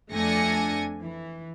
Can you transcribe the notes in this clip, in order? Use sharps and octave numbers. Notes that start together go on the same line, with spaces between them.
F2 A3 D4 G#5 A#6 C#7
E3